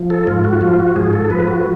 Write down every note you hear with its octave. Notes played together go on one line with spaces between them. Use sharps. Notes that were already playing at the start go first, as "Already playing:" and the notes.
Already playing: F3
A4
G#2 F4
F#4
F3 F4
F#4
G#2 G#4
A4
F3 B4
F#4